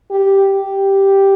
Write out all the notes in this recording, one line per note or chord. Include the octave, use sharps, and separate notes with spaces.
G4
G4